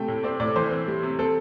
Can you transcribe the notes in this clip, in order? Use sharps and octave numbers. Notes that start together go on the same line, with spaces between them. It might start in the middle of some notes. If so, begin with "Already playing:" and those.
Already playing: C3 A3 G5
A2
C4 D5
A2 D5
E3 C5
C4
G3
C3
C4 A4